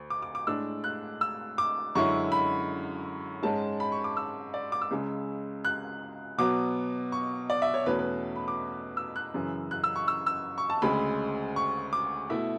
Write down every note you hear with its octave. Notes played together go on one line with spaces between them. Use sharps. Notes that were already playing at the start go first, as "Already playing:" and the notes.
Already playing: D2
D6
D6
D6
A2 G#3 D4 E6
F#6
E6
D6
F#2 D3 G#3 C#4 E4 C#6
B5
G#2 G#3 C#4 A5
B5
C#6
D6
E6
D5
D6
E6
C#2 C#3 G#3
F#6
B2 F#3 B3 D6
C#6
D5
E5
C#5
E2 B2 A3 C#4 B4
B4
B5
D6
E6
F#6
F#2 C#3 E3
F#6
E6
C#6
E6
E6
C#6
A5
D2 C#3 G#3 B5
C#6
D6
B2 A3 E4 E5